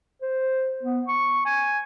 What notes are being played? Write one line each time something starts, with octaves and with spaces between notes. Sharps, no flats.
C5
B3
C#6
G#5